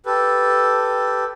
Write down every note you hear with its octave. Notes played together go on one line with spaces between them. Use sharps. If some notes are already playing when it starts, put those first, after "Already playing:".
G4 A4 B4